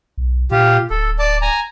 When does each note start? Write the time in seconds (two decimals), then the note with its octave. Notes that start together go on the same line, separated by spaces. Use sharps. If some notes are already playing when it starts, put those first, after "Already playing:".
0.18 B1
0.51 A#2 F4 G4
0.90 D1 A4
1.19 D5 A5
1.42 G#5 A#5